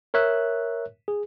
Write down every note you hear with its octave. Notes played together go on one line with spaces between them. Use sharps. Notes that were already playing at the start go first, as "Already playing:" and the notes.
A#4 C#5 E5 F#6
G#4